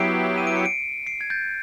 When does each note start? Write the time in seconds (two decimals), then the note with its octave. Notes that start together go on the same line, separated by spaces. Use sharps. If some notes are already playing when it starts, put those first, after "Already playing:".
Already playing: F#3 B3 E4 G4 C7 D7
0.38 D#7
0.47 D7
0.57 C#7
0.66 C7 D7
1.07 C7 D7
1.21 G#6
1.30 G6 A6